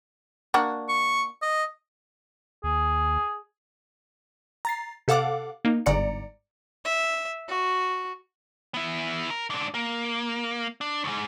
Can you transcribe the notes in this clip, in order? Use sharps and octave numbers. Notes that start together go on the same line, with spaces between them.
A#3 D4 F#4
C#6
D#5
D#2 G#4
A#5 A6 C7
C3 A4 F5 F#5 D6
A#3 D#4
G1 G#2 D5 A#5 C#7
E5
F#4
B3 E4
A#4
G#2 D4
A#3
D4
D#2 G#2